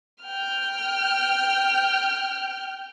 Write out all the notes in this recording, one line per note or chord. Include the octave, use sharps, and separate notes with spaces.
G5 F6